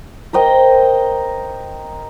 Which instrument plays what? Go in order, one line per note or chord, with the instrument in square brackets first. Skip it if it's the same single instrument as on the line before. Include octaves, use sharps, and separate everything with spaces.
[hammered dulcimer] A#4 C5 D#5 G5